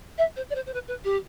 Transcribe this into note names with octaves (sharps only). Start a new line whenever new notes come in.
E5
C5
D5
C5
C5
B4
B4
G4